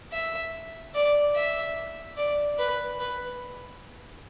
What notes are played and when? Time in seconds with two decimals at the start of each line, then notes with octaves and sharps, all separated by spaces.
0.13 E5
0.95 D5
1.36 E5
2.17 D5
2.58 B4
2.99 B4